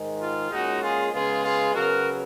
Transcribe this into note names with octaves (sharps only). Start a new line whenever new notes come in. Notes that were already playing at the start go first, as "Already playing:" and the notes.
Already playing: G#2 D#3 G#3
F4
A#2 G#3 C#4 D#4 F#4
F4 G#4
C#3 G#3 B3 F4 G#4
F4 G#4
C#3 F#3 B3 F#4 A#4